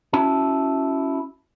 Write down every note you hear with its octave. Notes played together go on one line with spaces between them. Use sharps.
C#4 E4 F#4 A5